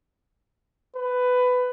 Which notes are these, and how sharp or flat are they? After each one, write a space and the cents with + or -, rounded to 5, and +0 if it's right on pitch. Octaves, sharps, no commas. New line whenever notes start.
B4 +15